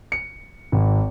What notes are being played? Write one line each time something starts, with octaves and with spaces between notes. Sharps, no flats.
C#7
G#1